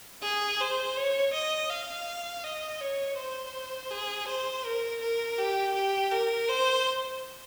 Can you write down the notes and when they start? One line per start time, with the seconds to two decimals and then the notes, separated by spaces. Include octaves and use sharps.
0.22 G#4
0.60 C5
0.97 C#5
1.33 D#5
1.71 F5
2.44 D#5
2.81 C#5
3.17 C5
3.91 G#4
4.27 C5
4.65 A#4
5.01 A#4
5.38 G4
5.74 G4
6.11 A#4
6.48 C5